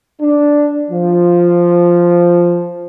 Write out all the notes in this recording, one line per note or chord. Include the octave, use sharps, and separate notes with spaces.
D4
F3